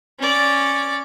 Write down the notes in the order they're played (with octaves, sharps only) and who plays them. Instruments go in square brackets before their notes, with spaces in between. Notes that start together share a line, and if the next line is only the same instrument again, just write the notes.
[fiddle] C#4 D5